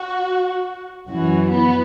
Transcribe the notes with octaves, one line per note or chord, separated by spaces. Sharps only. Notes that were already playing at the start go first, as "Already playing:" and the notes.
Already playing: F#4
F#2 E3 F#4
B3